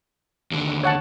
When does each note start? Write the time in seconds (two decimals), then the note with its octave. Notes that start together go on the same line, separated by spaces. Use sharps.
0.51 D#2 D3
0.83 C#5 F#5 A5